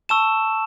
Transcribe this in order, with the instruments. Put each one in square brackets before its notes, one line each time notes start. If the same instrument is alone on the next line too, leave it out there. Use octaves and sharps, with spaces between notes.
[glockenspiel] A5 C#6 E6 E7